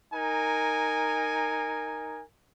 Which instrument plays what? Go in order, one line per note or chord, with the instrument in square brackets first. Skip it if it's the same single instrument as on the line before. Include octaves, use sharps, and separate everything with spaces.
[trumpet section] D#4 A#4 G#5